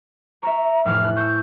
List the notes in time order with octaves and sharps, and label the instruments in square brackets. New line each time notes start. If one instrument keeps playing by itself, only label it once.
[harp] C#5 E5 [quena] A#5
[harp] F1 A2 E3 [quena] F6
[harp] A4 F#6
[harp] C#6 E6 [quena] G6